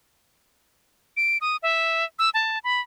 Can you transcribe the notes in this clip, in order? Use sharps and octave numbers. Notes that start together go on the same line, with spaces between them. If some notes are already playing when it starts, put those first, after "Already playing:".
D7
D#6
E5
E6
A5
B5